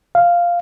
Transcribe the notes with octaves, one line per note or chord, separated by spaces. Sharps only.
F5